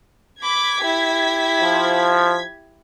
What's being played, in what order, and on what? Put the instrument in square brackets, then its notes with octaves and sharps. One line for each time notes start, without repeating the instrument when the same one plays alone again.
[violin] B5 D6 [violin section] G#6 B6
[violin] E4 G4
[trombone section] F3